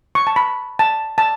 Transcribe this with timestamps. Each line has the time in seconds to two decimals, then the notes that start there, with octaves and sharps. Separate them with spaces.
0.15 C#6
0.27 A5
0.36 B5
0.79 A5
1.18 A5